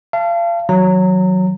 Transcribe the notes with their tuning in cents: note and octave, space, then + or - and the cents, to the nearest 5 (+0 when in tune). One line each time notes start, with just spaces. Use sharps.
F5 -35 A5 +0
D#3 +45 F#3 +0 A#5 -25